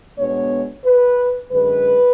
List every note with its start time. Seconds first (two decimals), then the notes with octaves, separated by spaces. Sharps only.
0.19 B2 G#3 B3 D4 C#5
0.85 B4
1.52 F#2 D3 G#3 B4